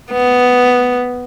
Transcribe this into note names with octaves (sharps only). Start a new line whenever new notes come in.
B3